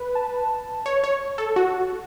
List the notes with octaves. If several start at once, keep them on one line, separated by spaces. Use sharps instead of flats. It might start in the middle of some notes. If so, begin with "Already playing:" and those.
Already playing: B4
A5
C#5
C#5
A4
F#4